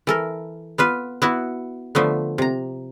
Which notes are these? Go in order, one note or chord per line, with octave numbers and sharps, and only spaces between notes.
E3 A4 A#4
B3 F4 B4
B3 E4 F#4
D3 F3 A3 B3
C3 A#5